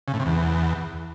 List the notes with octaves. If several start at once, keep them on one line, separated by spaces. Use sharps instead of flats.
C#3
A2
C3
E2